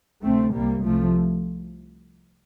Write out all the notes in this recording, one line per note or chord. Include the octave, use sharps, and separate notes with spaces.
D2 C3 A3 C4
C2 C3 G3 A#3
C2 C3 F3 A3